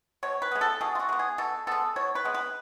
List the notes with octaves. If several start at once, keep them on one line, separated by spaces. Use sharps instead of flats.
B2 C#5
B4
G#3 B3
A4
B2 G#4
F4
F#4
G#3 B3
G#4
B2 A4
G#3 B3 A4
B2 C#5
B4
G#3 B3
B4